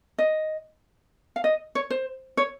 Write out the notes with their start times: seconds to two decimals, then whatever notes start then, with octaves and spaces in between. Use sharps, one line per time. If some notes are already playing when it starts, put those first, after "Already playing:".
0.19 D#5
1.36 F5
1.44 D#5
1.75 C#5
1.90 C5
2.37 C#5